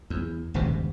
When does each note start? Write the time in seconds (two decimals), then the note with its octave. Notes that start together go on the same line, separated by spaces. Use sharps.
0.10 E2
0.54 D#1 C#2 G2 C3